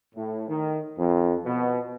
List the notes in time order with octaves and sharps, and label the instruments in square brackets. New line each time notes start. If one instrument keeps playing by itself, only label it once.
[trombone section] A2
D#3
F2
B2